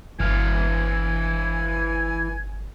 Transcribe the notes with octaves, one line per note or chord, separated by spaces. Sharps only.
G1 E3 F5 G#5